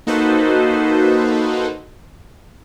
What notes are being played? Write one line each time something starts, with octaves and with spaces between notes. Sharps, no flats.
A#3 D#4 F#4 A4 B4 C5